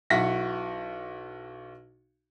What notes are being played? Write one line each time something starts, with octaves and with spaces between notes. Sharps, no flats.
B1 E4 F#4 F#5 A#6 B6